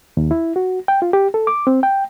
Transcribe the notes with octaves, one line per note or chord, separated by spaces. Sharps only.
D#2
E4
F#4
G5
F4
G4
A4
D6
C4
G5